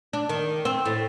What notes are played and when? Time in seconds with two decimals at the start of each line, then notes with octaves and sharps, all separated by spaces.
0.13 D4
0.29 D#3
0.65 C4
0.85 A2